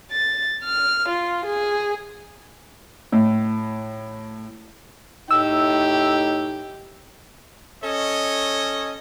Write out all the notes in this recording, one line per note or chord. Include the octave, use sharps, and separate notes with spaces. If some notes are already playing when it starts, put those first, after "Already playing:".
A6
F6
F4
G#4
A2
A2 D#4 G4 E6
C#4 A4 C#5 D#5